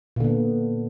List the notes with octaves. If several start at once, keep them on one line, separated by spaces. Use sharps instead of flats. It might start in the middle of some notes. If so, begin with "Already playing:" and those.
A#2 D3 B3